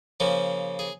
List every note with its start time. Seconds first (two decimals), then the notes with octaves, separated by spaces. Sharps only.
0.20 C#3 F3 A#3 C#4
0.79 G#4